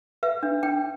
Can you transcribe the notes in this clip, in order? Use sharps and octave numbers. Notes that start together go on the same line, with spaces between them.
B4 E5
D4
D4 G5